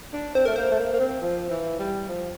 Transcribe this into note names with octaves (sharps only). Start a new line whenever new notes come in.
D4
C4 C5
A3 A#4
A#3 C5
A3
A#3
A#3
C4
F3
E3
G3
F3